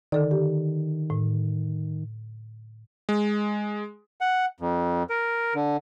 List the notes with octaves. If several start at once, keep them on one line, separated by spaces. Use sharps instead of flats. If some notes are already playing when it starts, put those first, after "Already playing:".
D3 D#3 A4 D5
G4
A2
G#3
F#5
F2
A#4
D3